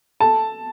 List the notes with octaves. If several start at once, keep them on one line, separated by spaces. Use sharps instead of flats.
A4 A5